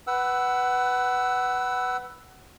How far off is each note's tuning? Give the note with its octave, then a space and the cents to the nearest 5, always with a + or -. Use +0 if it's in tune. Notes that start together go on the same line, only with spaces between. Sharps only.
B4 +0 F#5 +20 E6 +0